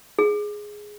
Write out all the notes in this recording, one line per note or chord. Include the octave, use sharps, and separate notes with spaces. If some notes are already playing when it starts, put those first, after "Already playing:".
G#4